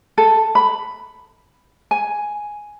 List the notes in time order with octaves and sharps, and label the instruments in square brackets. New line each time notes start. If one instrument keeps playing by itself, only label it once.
[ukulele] A4
B5
G#5